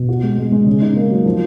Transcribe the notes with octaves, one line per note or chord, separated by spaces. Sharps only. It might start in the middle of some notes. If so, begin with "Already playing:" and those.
Already playing: B2
F#4
G#3
G#3
G#3
C#3
D#4
A#3
F#3
F3